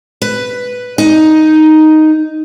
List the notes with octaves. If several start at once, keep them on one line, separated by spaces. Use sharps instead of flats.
B4
D#4